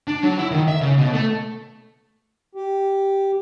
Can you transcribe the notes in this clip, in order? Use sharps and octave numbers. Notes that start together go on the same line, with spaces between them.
D4
F#3
E4
D#3
E5
C#3
B2
A3
G4